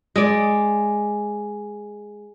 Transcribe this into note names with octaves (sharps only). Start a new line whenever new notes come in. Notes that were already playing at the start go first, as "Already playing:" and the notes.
G#3 D5